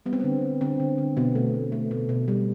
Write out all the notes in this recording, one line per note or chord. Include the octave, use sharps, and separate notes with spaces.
G3 B3
C4
D3 B3
D3
D3 C4
D3
D3
B2 B3
A3
A3
A3
B2
B2
G3